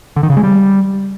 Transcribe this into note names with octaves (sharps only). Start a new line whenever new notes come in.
D3
D#3
C#3
G#3
G3